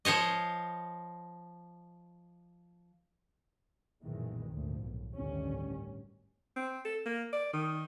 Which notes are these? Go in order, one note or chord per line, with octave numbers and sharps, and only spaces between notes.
F3 C5 C#5 D#5
B1 F#2 A#2 D#3 E3 G#3
G#1 D2 A#2 F3
B1
A1 D2 G2 D#3 G3 C#4
C4
A4
A#3
D5
D#3